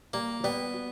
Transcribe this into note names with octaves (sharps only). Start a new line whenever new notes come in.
G3 A#3
G3 B3
F#4